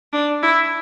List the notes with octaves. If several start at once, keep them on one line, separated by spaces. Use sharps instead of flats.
D4
E4